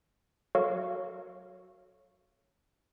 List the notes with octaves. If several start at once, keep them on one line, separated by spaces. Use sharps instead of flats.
F#3 F#4 A4 A#4 C#5 F5